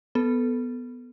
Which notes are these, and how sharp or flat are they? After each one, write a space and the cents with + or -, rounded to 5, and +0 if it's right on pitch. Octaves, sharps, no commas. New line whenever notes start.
B3 +0 A4 +0